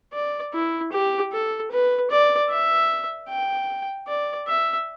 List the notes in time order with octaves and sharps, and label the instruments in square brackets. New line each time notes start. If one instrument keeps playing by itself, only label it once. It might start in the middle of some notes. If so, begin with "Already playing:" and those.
[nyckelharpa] D5
E4
G4
A4
B4
D5
E5
G5
D5
E5